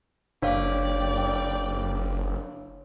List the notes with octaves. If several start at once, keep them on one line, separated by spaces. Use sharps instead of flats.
F#1 D4 C#5 D5 F5 G5